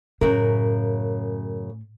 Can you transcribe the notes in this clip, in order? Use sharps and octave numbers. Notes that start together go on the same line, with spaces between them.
F#2 A2 C#3 A#4